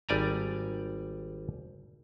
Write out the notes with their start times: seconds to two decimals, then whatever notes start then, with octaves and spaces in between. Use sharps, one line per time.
0.09 G#1 G3 D5 G#5 A#5